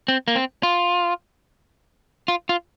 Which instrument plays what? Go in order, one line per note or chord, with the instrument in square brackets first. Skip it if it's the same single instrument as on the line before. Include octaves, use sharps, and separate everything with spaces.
[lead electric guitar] C4
A#3
C4
F4
F4
F4